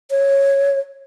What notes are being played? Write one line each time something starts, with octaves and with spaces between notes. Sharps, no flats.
C#5